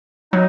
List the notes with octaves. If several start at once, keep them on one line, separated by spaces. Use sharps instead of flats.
F#3 D#4